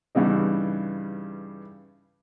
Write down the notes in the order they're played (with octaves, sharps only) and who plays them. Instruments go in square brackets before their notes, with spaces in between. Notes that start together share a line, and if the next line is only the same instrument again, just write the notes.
[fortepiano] G2 C#3 E3 G3 D#4